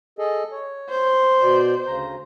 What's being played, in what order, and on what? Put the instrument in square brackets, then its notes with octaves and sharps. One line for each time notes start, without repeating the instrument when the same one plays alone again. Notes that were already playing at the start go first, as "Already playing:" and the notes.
[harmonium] G#4 A4 D#5
C#5
[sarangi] C5
[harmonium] B2 D5
D2 C#3 A#5